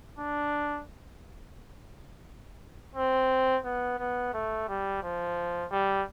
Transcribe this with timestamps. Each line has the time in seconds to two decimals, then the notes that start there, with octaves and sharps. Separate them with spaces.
0.19 D4
2.95 C4
3.65 B3
3.99 B3
4.34 A3
4.68 G3
5.03 F3
5.72 G3